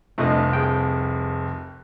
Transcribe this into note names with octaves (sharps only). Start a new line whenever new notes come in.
F1 C2 F3 A3 D4 D#5
G#4 G5